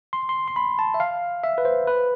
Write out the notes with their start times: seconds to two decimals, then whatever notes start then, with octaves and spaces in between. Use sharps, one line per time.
0.13 C6
0.29 C6
0.48 C6
0.56 B5
0.79 A5
0.94 E5
1.00 F5
1.43 E5
1.58 B4
1.65 C5
1.87 B4